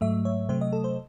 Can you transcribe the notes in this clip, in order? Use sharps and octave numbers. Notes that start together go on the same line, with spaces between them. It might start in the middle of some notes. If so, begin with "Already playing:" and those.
G#2 F#3 A3 E5
C#5
C3 F#3 A3 C5
D#5
A4
C5